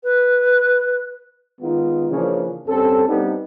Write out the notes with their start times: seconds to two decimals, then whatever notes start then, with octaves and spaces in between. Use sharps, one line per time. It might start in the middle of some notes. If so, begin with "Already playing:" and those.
0.03 B4
1.61 D#3 G#3 B3 D#4 F4
2.10 C#3 E3 F3 A#3 C#4 D4
2.68 G2 C4 C#4 A4
3.08 G3 B3 C4 D4 D#4